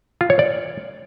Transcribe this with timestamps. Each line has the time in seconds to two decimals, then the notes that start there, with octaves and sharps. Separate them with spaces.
0.21 F4
0.30 C#5
0.39 D5